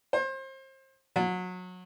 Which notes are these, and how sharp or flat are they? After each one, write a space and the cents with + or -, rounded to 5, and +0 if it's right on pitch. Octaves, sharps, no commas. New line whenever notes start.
C5 +30
F#3 -25